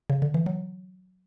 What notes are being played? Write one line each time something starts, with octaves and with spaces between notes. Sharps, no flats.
C#3
D3
E3
F#3